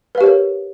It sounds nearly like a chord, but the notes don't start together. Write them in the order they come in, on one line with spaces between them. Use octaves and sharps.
B4 F5 G4 C#5 A#4